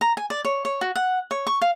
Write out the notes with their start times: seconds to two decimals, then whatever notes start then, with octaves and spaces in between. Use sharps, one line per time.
0.01 A#5
0.17 G#5
0.30 D5
0.45 C#5
0.65 C#5
0.81 F#4
0.96 F#5
1.31 C#5
1.47 C#6
1.62 F5